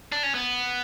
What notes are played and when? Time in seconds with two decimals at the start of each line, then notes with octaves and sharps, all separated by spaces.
0.12 D4
0.23 C#4
0.34 B3